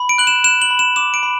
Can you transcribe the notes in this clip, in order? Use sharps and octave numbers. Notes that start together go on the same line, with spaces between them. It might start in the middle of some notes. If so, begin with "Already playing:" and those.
Already playing: B5
D7
F#6 F#7
E7
F#6 E7
F#7
B5
E7
D6 E7
D7
B5